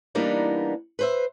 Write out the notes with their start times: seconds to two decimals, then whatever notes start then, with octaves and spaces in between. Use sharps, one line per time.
0.15 E3 G3 A#3 B3 D4 D#4
0.99 B4 C5 E5